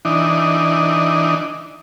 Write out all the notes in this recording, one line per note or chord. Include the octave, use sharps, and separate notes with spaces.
E3 D4 D#4